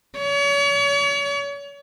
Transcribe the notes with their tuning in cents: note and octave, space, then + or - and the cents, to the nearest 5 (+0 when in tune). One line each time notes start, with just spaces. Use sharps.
C#5 +40